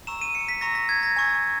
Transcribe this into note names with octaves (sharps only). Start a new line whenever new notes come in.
A#5 C#6 E6 E7
D#7
C#7
B6
A#5 C#6 E6 A#6
A#6
G#6
A#6
G#5 C#6 E6 G#6